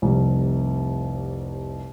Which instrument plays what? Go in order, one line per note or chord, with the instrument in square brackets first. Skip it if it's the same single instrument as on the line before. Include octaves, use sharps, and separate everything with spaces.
[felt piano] F1 C2